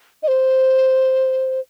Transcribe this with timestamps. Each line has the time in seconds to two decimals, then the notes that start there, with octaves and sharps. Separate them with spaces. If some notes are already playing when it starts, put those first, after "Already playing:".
0.23 D#5
0.28 C5